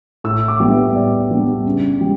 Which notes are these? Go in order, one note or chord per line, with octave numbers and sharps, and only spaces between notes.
A2 E6
D6
G3 B3 D4
E5
E5
A2 D5
G3 B3 D4
C#3
G3